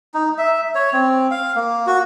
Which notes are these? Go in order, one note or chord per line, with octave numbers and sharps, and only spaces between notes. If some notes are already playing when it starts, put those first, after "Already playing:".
D#4
E5
C#5
C4
F5
A#3
F#4